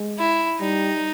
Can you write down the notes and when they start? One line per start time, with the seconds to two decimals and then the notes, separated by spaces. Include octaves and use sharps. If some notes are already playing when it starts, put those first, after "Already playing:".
Already playing: G#3
0.19 E4
0.60 G3 D#4